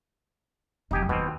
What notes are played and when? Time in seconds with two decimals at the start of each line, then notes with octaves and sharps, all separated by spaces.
0.91 F1 F#3 D#4 G4 G#5
1.09 D#2 B2 C4